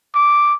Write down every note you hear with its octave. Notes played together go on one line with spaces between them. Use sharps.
D6